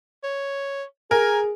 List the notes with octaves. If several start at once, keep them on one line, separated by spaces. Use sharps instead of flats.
C#5
G#4 A#4 G#5